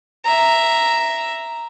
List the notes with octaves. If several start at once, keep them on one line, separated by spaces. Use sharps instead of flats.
E5 A#5